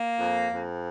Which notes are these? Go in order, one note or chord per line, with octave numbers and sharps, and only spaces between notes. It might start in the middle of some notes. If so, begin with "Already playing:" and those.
Already playing: A#3
F2
F2